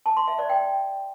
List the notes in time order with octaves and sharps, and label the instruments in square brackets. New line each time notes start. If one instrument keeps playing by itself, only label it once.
[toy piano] A5
C6
E5
D5
G5